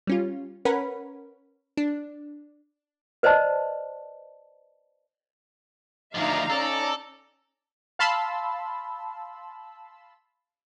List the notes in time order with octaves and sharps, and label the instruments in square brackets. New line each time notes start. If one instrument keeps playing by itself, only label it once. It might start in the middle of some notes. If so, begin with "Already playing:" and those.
[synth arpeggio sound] G3 C#4 F4
C#4 A#4 B4 F#5 B5
D4
[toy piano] B4 C5 D5 D#5 A5
[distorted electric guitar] D2 F3 [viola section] D#4 A#5 [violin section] D5 E5 F5
[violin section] C#4 D5 [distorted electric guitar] A4
[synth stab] F5 A5 B5 C6 E6